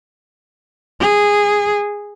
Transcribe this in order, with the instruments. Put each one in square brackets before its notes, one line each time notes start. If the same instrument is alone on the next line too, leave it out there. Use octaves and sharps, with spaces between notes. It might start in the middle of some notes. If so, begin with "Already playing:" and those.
[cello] G#4